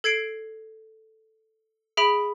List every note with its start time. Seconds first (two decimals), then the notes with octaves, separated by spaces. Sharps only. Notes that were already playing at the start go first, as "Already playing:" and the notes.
0.04 A4 G#6 C7 D7
1.97 G#4 E5 B5 D7